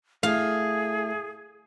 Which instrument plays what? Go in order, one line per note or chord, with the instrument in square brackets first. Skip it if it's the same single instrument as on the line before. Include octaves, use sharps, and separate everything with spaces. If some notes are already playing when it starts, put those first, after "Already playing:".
[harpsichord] A2 [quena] G#4 [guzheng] F5